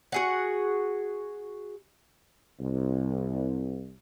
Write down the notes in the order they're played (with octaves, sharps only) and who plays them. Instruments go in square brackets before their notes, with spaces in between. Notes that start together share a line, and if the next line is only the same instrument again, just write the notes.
[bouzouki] F#4 G#4 F#5
[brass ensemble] C2